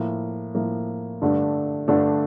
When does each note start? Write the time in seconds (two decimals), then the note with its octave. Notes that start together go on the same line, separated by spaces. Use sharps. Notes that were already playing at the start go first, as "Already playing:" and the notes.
Already playing: A2 F3 A#3
0.55 A2 F3 A#3
1.21 G2 D3 A3 D4
1.88 G2 D3 A3 D4